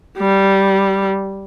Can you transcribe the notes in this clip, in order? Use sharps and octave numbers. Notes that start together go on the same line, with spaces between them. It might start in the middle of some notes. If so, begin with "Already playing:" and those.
G3